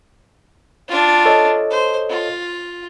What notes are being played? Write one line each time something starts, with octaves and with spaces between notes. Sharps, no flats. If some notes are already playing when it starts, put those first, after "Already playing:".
D4 F4
A4 C#5 D#5
C5
F4